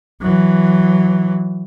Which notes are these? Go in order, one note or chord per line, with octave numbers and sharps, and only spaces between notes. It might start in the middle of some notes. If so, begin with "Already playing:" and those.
E3 F#3